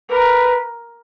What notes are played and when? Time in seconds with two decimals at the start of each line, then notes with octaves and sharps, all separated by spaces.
0.09 A#4 B4